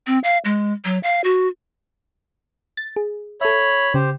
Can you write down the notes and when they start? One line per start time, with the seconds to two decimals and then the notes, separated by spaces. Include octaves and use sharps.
0.07 C4
0.24 F5
0.45 G#3
0.85 F#3
1.03 F5
1.24 F#4
2.77 A6
2.96 G#4
3.41 A4 C#5 E5 B5
3.94 C#3 G4 C5